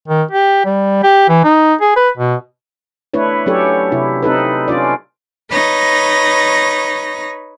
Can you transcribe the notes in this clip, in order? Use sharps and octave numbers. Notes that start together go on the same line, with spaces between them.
D#3
G4
G3
G4
E3
D#4
G#4
B4
B2
A3 D4 E4 B4 C#5
F#3 C#4 D4 G4 A4 C#5
C3 E4
C4 D#4 A4 B4
C#4 D4 F4 D5
D#4 B4 C#5 A#6